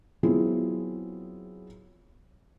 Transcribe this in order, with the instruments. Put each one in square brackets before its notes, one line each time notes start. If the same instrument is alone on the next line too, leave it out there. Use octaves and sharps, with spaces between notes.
[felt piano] F#3 B3 C4 E4 F4 G#4